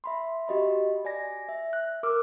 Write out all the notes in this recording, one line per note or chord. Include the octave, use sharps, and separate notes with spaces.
E5 B5 C6
F#4 G4 D#5 B5
D5 G#5 A#6
E5
F#6
A#4 D6 E6 F6